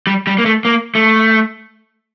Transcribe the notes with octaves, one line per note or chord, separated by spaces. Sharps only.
G3
G3
A#3
A3
A#3
A3